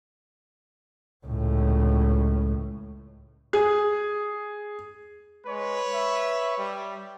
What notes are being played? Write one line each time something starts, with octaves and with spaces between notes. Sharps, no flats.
C#2 A2
G#4
G#3 B4 C#5
E5
G3